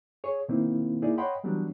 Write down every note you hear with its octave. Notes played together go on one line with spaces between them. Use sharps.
G#4 C#5
B2 D#3 A#3 C4 D#4 E4
A#3 D#4 E4 G#4 D5
C#5 D#5 F#5 G5 B5 C6
E3 F#3 G3 B3 D4